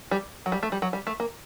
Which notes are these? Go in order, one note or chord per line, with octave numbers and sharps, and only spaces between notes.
G3
F#3
G3
A3
G3
F#3
G3
A3
A#3